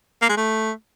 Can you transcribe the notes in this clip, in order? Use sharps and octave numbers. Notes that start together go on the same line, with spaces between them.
A#3
G#3
A3